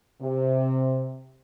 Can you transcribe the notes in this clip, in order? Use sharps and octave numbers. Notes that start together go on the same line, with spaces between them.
C3